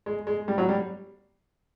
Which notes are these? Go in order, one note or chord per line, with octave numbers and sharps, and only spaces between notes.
G#3
G#3
G3
F#3
G3